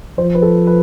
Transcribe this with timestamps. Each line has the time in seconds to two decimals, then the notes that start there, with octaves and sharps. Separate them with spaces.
0.18 F3 C5
0.35 B4
0.42 A4
0.67 B4